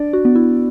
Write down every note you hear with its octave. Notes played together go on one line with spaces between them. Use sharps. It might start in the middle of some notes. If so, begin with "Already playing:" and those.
Already playing: D4 D5
F#4
B3
E4